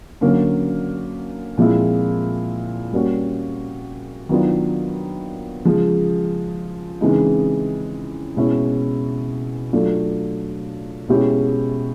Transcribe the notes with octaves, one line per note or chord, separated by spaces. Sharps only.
D3 F#3 A#3 C#4
A#2 F3 G#3 C4 E4
G3 A#3 C#4 F#4
D#3 F#3 B3 D4 F4
C#3 F3 G#3
C#3 E3 G#3 C4 D#4
B2 G#3 C#4 E4
F#3 A3 D4 F4
B2 G#3 C#4 E4 G4